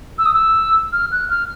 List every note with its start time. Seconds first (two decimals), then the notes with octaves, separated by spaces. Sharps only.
0.18 E6
0.26 D#6
0.34 E6
0.93 F6
1.12 F#6
1.30 F6